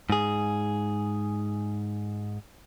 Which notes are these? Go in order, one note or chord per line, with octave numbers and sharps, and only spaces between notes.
G#2 G#4